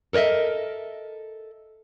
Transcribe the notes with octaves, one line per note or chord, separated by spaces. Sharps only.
A4 A#4 C#5 D#5 E5